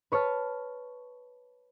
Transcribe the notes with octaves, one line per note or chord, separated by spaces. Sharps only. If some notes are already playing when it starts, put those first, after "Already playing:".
B4 C#5 A5 F6